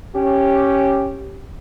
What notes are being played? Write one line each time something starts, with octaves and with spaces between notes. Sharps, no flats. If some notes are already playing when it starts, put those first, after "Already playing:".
C#4 G4